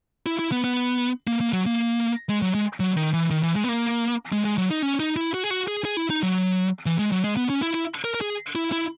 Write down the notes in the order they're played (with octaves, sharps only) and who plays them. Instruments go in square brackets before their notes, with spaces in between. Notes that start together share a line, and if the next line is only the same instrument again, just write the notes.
[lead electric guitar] E4
E4
B3
B3
A#3
A#3
F#3
A#3
G#3
F#3
G#3
F#3
D#3
E3
D#3
E3
G#3
B3
A#3
G#3
G#3
F#3
D#4
C#4
D#4
E4
F#4
G#4
F#4
G#4
G#4
E4
D#4
F#3
E3
G#3
F#3
G#3
B3
C#4
E4
E4
A#4
A#4
G#4
E4
E4